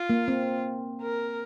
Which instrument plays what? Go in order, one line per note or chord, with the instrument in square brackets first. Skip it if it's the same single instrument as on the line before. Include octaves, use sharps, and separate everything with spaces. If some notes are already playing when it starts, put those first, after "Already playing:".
Already playing: [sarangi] F4
[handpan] A#3
C4
[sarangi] A#4